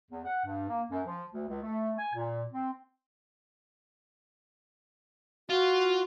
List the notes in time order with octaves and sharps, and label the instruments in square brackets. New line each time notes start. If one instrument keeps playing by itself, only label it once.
[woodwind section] E2
F#5
G2
A#3
F#2
F3
D2
C#2
A3
G#5
A#2
C4
[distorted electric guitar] F4 [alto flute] F#4